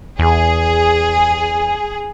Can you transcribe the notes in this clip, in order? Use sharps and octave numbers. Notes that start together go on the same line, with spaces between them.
E2 G#4